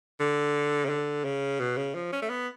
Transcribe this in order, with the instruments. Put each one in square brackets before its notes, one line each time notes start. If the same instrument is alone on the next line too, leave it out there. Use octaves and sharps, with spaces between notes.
[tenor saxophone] D3
C#3
D3
C#3
B2
C#3
F3
C#4
A3
B3